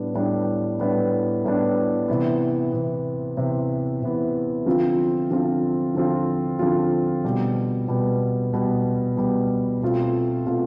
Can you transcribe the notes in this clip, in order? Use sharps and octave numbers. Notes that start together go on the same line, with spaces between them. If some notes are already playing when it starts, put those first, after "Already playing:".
Already playing: A2 G3 B3 D4
A2 G3 B3 D4
A2 G3 B3 D4
A2 G3 B3 D4
C3 E3 B3
C3 E3 B3
C3 E3 B3
C3 E3 B3
D3 F3 C4 F4
D3 F3 C4 F4
D3 F3 C4 F4
D3 F3 C4 F4
B2 G3 B3
B2 G3 B3
B2 G3 B3
B2 G3 B3
B2 A3 C4 F4
B2 A3 C4 F4